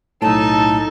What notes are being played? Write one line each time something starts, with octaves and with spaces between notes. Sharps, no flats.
B1 A2 D#4 A4 A5